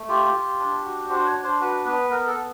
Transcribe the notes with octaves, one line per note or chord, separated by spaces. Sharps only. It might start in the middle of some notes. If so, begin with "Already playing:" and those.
Already playing: A3
F4 G4
F4
D4
F#4
D4 C5
C#5
D4
C5
F#4 B4
B3 B4
B3 A#4
A4
B3